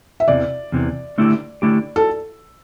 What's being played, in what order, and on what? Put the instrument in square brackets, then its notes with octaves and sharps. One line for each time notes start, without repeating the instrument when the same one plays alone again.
[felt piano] E5
[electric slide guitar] E2 C3 E3 [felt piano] D5
[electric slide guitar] E2 C3 E3
D3 A3 E4 G4
D3 A3 E4 G4
[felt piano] A4